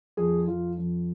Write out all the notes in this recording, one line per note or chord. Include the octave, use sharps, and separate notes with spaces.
F2 G#4
F2 F4
F2